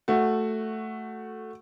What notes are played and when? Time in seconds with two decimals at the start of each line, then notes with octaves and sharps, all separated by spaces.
0.08 A3 F#4